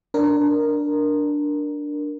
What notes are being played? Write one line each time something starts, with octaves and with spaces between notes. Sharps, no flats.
D4 A#4